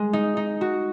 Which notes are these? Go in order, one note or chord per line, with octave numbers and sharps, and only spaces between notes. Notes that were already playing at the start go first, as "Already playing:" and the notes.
Already playing: G#3
D#4
D#4
F#4